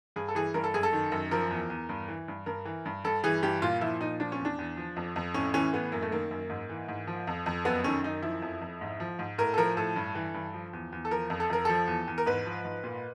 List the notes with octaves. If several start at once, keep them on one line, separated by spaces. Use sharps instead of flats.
G2 G#4
A4
E3 G#4
G2 A#4
A4
F#2 G#4
A4
D#3
F#2
F3 A#4
E2
E2
G2
E3
G2
G2 A#4
E3
G2
G2 A4
E3 G#4
G2 G4
A#2 F4
F3 E4
A#2 D#4
F3 D4
C#4
E2
D4
E2
F3
F2
F2
A2 C#4
E3 C#4
A2 B3
F#2 A#3
A3
D#3 A#3
F#2
G#2
E3
G#2
F3
F2
F2
F#2 B3
D#3 C#4
F#2 D#4
F3 E4
F2
F2
G#2
F3
G#2
A2 A#4
A4
F3 A#4
A2 A4
G2
E3
G2
F3
E2
E2
A4
F3 A#4
F2
A4
F2 A#4
F3 A4
E2
E2
A#4
G#2 B4
F3
G#2
A#2